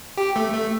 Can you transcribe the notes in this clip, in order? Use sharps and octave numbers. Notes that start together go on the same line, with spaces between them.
G4
A3
A3